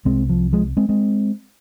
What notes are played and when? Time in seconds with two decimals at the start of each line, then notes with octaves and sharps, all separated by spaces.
0.05 C2 C3 G#3 C4
0.29 F3
0.53 F3 G#3
0.77 G#3 C4
0.89 G#3 C4